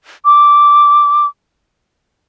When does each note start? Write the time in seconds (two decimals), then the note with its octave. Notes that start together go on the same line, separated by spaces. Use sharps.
0.25 D6